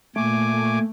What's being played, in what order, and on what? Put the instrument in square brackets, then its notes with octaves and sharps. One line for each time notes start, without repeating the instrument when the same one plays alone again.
[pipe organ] A#2 G#5 D6 [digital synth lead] A3